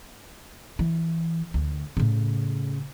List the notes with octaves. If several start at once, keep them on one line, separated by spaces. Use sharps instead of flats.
E3
D2
A2 C#3